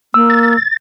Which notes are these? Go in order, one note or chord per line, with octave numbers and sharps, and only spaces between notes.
A#3 E6
A6